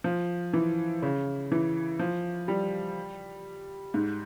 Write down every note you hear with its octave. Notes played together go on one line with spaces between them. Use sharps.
F3
E3
C#3
E3
F3
G3
G#2